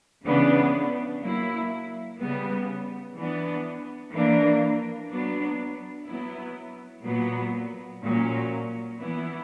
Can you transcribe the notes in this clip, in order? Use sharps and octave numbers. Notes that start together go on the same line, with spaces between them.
C#3 E3 B3 D4
F#3 A#3 E4
C#3 G3 B3
E3 B3 D4
E3 A#3 D4
F#3 B3 D4
F#3 B3 E4
A#2 F#3 B3
A#2 F#3 C#4
E3 B3 E4